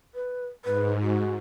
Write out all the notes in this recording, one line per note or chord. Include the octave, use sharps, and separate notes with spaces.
B4
G#2 B4
F#4